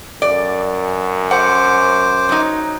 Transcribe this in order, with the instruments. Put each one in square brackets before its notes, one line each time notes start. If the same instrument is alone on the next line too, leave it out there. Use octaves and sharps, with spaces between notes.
[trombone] F#2 [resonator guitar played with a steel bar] D5
[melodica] C5 D6 [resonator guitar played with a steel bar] F#5
[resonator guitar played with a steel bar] F#3 D#4